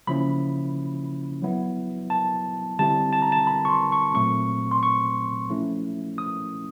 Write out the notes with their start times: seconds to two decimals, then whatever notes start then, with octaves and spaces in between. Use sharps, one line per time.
0.07 C#3 F3 A#3 C#4 E4 B5
1.42 F#3 B3 E4
2.10 A5
2.79 D3 G3 C4 E4 A5
3.13 A5
3.22 A#5
3.32 A5
3.47 B5
3.65 C#6
3.69 C6
3.92 C#6
4.14 A#2 F#3 A3 C4 C#6
4.71 C6
4.83 C#6
5.50 F3 A3 C#4 E4
6.18 D#6